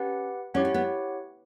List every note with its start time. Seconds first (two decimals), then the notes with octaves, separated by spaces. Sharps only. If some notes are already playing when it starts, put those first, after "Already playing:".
Already playing: C#4 G4 B4 F#5
0.54 C#4 E4 G4 C#5 F#5
0.65 C#4
0.74 B3